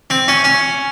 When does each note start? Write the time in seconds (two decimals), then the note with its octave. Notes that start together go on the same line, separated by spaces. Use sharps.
0.10 C4
0.28 C#4
0.44 C#4